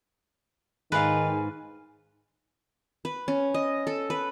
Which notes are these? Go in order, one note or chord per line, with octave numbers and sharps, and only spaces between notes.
G#2 D#3 B4 F5 G#5
B4
C#4
D#5
A4
B4